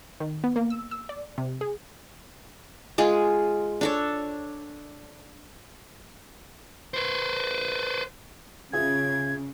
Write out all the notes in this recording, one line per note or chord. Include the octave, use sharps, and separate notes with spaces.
D#3
B3
A#3
E6
E6
D5
C3
G#4
G#3 F4 G#4
D4 A4 C#5
B4 C5
C#3 F4 G#4 E5 G#6